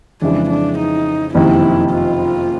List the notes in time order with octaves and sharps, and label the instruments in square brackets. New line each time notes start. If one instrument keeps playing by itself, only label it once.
[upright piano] F2 C#3 E3 G#3 [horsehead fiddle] D4
[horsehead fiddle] D4
D#4
[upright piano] F#1 F2 C3 D#3 [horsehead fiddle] E4
[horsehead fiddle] F4